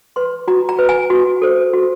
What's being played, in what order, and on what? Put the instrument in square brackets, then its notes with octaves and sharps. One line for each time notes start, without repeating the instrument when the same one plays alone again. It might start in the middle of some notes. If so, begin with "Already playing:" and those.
[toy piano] B4 C6
F#4 A#5
A#5
B4
G#5
F#4
A4 C5
F#4